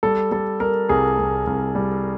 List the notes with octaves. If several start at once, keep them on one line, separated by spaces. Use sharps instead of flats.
G3 A4
G3 A4
G3 A#4
C2 G#4
C2
C2
G3